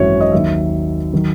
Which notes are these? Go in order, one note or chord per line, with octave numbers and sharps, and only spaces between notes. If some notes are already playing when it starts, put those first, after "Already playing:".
Already playing: G#1 F#2 E3 F#4 C#5 E5
D#5
D#2 D#3 F#3 E5
D#3 F#3